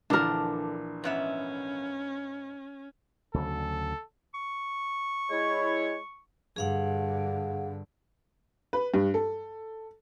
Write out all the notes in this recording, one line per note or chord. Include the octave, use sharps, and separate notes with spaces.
A#1 D3 E3 D4 A#4 A5
G#2 B3 C#4 E5
D2 C#3 F#3 A4
C#6
G#3 E4 C#5
G2 D3 G#4 F5 F#5
B4
G2
A4